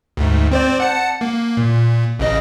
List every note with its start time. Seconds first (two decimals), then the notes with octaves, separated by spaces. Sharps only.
0.17 D2 G#2
0.51 C4 C5 D5
0.80 F#5 A5 C#7
1.21 A#3
1.57 A#2
2.20 A1 C#3 D#5